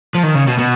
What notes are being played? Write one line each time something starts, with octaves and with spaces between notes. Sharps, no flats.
F3
D#3
C#3
B2
B2